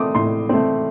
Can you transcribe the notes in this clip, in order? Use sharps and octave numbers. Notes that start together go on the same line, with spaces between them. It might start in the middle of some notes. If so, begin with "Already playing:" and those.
Already playing: A3 C4 D6 D#6
A2 C6
A3 C4